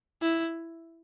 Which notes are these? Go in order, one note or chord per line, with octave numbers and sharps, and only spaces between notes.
E4